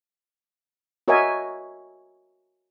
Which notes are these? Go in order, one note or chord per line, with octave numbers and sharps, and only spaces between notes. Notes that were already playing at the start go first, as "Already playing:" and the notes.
F#4 A#4 C#5 D#5 E5 G#5